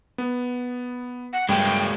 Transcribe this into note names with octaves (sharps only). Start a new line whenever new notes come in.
B3
F#5
G2 F#3 G#3 A#3 G5